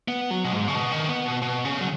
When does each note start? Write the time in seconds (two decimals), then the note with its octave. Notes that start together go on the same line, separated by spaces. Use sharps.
0.08 B3
0.31 F#3
0.44 B2
0.52 G#2
0.68 C#3
0.75 B2
0.92 D#3
1.09 B3
1.25 B2
1.42 B2
1.65 C#3
1.81 F#3